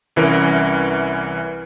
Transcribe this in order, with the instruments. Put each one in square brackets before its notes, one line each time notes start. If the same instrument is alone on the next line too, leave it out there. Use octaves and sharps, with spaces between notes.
[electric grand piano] C2 E3 C#4 A#4